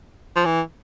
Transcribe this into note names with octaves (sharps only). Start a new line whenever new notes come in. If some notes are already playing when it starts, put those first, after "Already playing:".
F3
E3